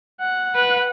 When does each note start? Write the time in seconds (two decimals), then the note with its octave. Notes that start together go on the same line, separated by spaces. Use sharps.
0.20 F#5
0.55 B4